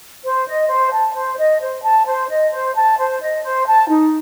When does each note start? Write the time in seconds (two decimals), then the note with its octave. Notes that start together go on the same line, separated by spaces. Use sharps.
0.24 C5
0.47 D#5
0.69 C5
0.92 A5
1.15 C5
1.38 D#5
1.61 C5
1.83 A5
2.06 C5
2.29 D#5
2.52 C5
2.75 A5
2.98 C5
3.20 D#5
3.43 C5
3.66 A5
3.89 D#4